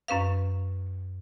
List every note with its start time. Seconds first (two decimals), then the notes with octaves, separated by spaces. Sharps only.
0.08 F#2 C#4 B4 F5